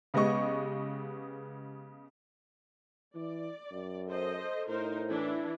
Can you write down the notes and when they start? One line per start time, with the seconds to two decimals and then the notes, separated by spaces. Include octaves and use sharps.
0.14 C#3 G#3 B3 G4 D#5 C#6
3.15 E3 D5
3.72 F#2
4.08 A4 C5 D#5
4.68 A2 D#4 A#4 C5
5.09 E3 D4 E4